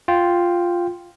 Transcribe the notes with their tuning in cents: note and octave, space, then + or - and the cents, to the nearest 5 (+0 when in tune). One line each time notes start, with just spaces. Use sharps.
F4 +0 G5 +0